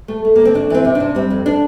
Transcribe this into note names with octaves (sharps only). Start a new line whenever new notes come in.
A3
A3
D3 A#3
C4
D2 D4
E3 C4
C3
D4
C3
G3 C4
F2
D4